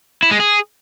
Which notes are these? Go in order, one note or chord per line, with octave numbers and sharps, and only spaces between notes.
E4
G#3
G#4